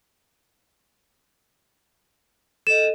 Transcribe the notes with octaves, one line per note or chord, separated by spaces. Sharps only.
A4 D#5 E7